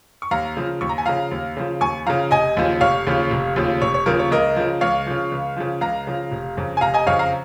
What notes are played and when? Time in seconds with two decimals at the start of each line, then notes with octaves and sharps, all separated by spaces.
0.22 C#6
0.31 D#2 F5 A#5
0.56 C#3 F3
0.81 D#2 C#6
0.89 A#5
0.98 G#5
1.06 C#3 F3 F5 A#5
1.31 D#2
1.57 C#3 F3
1.81 D#2 G#5 C#6
2.06 C#3 F3 F5 A#5
2.31 F1 D#5 G#5
2.57 D#2 C#3 F3
2.81 F1 C#5 F5
3.07 D#2 C#3 F3
3.31 F1
3.56 D#2 C#3 F3
3.81 F1 C#5
3.94 C#5
4.06 D#2 C#3 F3 A#4
4.19 C#5
4.31 C#2 A#4 D#5
4.56 C#3 F3
4.81 C#2 C#5 F5
5.06 C#3 F3
5.32 C#2
5.57 C#3 F3
5.81 C#2 F5 A#5
6.07 C#3 F3
6.32 F1
6.57 F2 C#3
6.77 G#5
6.81 F1 F5 A#5
6.94 D#5 G#5
7.07 F2 C#3 C#5 F5
7.19 F5 A#5